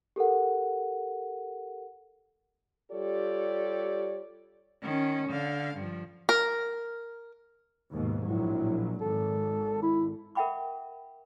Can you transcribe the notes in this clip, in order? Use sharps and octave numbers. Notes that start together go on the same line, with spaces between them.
G4 A4 A#4 F#5
G3 F4 G4 A4 C#5 D5
D#3 C#4
D3 F5
G2 F3
A#4
D#2 G#2 B2
A#1 A2 F#3
G#1 A4
E4
A#4 E5 F#5 G5 B5 D6